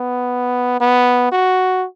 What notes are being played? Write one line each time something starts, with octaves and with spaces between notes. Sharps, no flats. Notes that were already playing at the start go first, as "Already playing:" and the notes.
Already playing: B3
B3
F#4